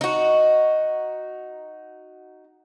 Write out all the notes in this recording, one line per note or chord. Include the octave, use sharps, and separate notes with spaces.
D#4 F#4